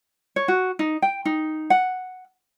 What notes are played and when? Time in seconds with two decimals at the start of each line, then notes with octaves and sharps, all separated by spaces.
0.36 C#5
0.48 F#4
0.79 D#4
1.02 G5
1.25 D#4
1.70 F#5